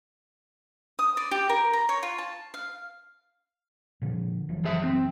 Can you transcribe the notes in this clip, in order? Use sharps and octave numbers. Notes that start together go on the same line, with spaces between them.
D#6
D5
G4
A#4
A#5
C#5
F4
A5
F5
A#2 D3 F3
F#1 E3 F#3
F3 G#4 E5
C4